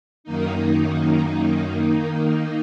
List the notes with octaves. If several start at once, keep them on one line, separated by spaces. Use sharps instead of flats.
F#2 D#3 A#3 D#4
D#3 A#3 D#4